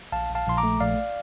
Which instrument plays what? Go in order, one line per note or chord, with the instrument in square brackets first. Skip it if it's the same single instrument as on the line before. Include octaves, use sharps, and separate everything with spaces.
[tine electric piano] A#1 F5 A5
A#1
F5 A5
A#1 C6
A#5 D6
A3
A#1 D5 F5